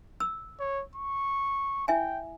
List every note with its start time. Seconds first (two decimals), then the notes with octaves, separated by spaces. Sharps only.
0.20 E6
0.60 C#5
0.95 C#6
1.88 E4 E5 G5 G#5